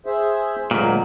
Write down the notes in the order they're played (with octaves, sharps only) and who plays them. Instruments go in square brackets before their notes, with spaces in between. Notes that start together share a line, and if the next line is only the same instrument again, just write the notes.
[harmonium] G#4 C5 E5
[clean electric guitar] D2 G2 A#2 [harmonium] F#3 G#3 A#3